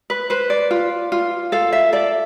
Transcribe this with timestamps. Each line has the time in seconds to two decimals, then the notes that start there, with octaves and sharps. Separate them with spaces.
0.10 B4
0.30 B4 C5
0.50 D5
0.71 F4
1.12 F4
1.52 A4 F5
1.73 E5
1.93 A4 D5